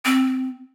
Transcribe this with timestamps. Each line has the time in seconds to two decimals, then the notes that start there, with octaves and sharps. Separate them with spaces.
0.05 C4